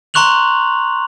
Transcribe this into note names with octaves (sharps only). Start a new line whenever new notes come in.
A#5 C6 C#6 F#6 F7 F#7